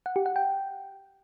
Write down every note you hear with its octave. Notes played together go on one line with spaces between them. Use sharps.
F#5
G4
F#5
G5